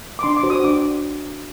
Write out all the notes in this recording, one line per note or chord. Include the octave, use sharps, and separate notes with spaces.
D6
D4 C6
D6
F#4 C5
D#6
D4 D6